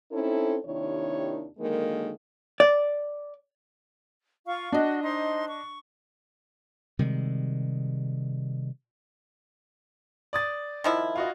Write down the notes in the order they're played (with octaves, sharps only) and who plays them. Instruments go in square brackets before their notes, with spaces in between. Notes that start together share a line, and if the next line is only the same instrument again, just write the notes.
[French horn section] C4 C#4 D#4 E4 A4
D#2 C3 D#3 D4 E4 C#5
D3 D#3 F#3 G#3 A#3
[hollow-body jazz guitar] D5
[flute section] F4 F5 C#6
[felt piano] D4 D#5 [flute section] F#4
[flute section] D#4 C5 C6
C#6
[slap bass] C3 D#3 G3 G#3
[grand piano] D5 D#6 A6
[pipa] D#3 F3 E4
[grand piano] F4 F#4 D#5